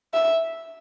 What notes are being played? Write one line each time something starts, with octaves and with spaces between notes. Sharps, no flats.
E5